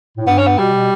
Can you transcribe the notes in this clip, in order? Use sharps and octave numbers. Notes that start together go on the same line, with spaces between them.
A2
G2 B3
C#4
B3
B2 G3
B2